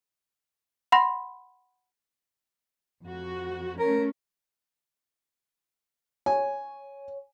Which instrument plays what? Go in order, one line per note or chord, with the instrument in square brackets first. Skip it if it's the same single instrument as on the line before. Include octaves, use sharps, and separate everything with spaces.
[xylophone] F#5 B5 C6 A#6
[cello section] F2 F#4
[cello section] A3 C#4 [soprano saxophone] A#4
[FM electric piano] C#5 [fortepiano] G#5